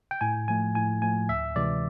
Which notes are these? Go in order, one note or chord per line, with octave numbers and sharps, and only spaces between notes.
G5
A2 G#5
F3 A3 G#5
A2 G#5
F3 A3 G#5
D2 E5
C3 E3 G#3 D5